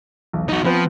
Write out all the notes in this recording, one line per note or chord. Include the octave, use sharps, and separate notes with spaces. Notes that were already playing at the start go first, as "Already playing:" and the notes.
E1 B1
D#4 F#4
F3 B3 C4 B4